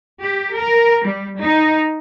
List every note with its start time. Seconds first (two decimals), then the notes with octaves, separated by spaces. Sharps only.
0.22 G4
0.55 A#4
1.06 G3
1.41 D#4